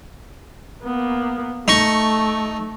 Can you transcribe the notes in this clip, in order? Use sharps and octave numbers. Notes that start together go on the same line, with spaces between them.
A#3 B3
A3 D#4 C#6